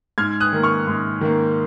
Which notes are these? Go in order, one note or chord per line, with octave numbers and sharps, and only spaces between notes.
G#2 F6 G#6
D#6 F#6
D#3 A#3
C#6 F6
G#2
D#3 A#3